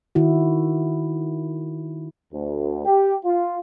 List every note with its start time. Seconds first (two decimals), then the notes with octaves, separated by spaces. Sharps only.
0.15 D#3 E4 F#4
2.32 D2
2.85 G4
3.25 F4